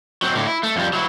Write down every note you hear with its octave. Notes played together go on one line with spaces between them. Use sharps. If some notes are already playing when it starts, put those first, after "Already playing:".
F#3 C4
A2 D3
E4
A3
F2 G3
F#3 E4